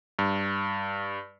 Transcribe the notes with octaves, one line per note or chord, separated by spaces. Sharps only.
G2